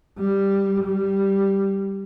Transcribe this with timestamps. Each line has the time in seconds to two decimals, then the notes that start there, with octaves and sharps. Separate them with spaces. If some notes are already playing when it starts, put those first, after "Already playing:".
0.19 G3
0.84 G3